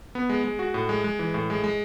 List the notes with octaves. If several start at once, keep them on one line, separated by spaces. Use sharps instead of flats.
B3
G#3
G#3
F#4
A2
G#3
G#3
E3
A2
G#3
G#3